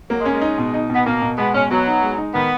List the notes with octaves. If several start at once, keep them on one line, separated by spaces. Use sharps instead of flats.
F#3 A#3
G#3
C#4
G#3
D#4
B2
D#4
B2
B3
B2 A#3
B2
G#3 B3
B2 C#4
F#3 B3
D#4
G#3
D#4
D#3 B3